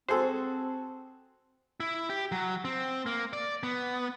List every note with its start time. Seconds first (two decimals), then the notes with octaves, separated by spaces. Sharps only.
0.09 C4 F#4 G#4 A4 C5
1.80 E4
2.09 G4
2.32 F#3
2.65 C4
3.06 A#3
3.33 D5
3.63 B3